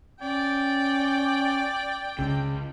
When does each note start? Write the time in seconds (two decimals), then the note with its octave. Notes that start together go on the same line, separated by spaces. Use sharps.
0.22 C#4 D5 G5
2.19 C#2 C#3